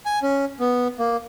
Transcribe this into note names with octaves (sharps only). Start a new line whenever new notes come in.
G#5
C#4
B3
A#3